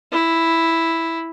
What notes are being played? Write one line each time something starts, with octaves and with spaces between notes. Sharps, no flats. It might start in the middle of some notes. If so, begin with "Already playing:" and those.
E4